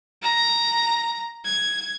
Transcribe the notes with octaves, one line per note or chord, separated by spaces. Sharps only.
A#5
G#6